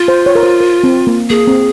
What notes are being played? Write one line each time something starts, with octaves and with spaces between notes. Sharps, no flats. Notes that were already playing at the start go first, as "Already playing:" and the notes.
Already playing: F4
C5
C#5
A#4
C5
A#4
C4
A#3
A#3 G#4
C4